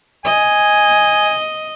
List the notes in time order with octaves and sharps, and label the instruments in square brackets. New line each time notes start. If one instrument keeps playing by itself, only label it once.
[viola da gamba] D#5 [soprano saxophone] G#5